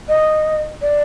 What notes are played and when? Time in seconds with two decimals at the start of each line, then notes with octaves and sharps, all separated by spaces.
0.08 D#5
0.82 D5